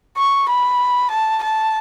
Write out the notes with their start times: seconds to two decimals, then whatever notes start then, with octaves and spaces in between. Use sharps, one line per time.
0.18 C#6
0.49 B5
1.11 A5
1.43 A5